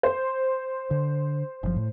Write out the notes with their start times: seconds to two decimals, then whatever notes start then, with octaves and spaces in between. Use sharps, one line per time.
0.03 C5
0.91 D3
1.63 F#1 B2 F3
1.76 A2